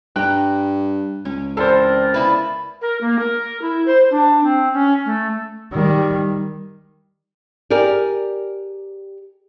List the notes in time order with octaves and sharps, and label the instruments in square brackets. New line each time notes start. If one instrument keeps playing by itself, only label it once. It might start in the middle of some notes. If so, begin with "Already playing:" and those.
[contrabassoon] G2 [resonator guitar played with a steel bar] G5 A#5 [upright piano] F#6
[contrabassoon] C#2 [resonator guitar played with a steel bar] C#4
[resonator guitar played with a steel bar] E3 [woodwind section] C4 A#4 D5 [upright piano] A4 C5
[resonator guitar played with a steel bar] C#3 E4 B4
[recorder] A#4
A#3
A#4
E4
C5
D4
C4
C#4
A3
[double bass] D#3 G3
[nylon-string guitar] G4 G#4 A#4 D5